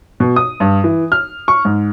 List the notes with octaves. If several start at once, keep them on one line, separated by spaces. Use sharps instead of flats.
B2
D#6
G2
E3
F6
C#6
G#2